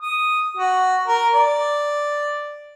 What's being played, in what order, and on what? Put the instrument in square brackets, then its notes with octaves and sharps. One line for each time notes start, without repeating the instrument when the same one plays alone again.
[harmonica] D#6
F#4
A#4
D5